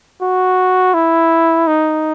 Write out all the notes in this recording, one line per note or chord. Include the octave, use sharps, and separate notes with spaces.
F#4
E4
D#4